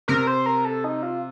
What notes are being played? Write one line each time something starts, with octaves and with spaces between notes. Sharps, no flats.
C3 A#4
C5
A#4
A4
D#4
F4